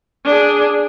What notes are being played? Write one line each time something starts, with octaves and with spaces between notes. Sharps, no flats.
D4 G#4